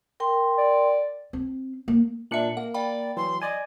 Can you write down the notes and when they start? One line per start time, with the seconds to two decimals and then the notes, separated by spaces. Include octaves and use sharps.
0.20 A#4 G5 C6
0.58 D5
1.33 C4
1.88 A#3
2.31 A#2 D4 E5 C#7 F#7
2.57 A#3 F#5
2.74 D5 F5 G5 B5
3.17 E3 F#3 C6
3.42 D5 D#5 G#5